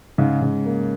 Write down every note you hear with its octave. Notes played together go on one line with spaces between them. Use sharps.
G#2 C#3
C#3
A#3